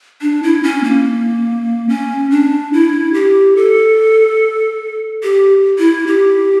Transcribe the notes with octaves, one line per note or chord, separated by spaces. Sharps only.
D4
E4
C#4
A#3
C#4
D4
E4
G4
A4
G4
E4
G4